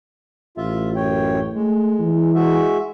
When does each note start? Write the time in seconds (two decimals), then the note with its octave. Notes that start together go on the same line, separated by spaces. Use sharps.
0.57 A1 F4 E5
0.96 F#2 C#5 G5
1.53 G#3 A3
2.00 E3
2.35 G#3 F#4 E5